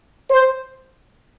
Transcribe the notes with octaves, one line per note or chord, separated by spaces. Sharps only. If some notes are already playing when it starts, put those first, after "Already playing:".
C5